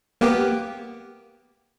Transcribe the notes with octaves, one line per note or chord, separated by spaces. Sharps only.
A#3 B3 G4